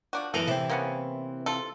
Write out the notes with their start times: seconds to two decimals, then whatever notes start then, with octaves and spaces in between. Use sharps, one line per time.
0.13 F3 D4 F#4
0.34 F#2 E3 B3 A4 A#4
0.47 C3 E3 C4 E4
0.70 A#3 B3 C#4
1.46 F4 A4